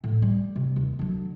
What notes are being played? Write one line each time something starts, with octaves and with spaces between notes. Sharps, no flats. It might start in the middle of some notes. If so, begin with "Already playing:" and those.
A2
G3
C3
D#2
D3 F#3